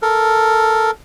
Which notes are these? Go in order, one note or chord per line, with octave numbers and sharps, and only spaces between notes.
A4 A#4